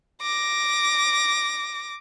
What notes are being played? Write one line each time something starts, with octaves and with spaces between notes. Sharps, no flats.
D6 A#6